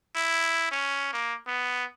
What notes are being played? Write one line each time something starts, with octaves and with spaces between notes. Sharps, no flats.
E4
C#4
A#3
B3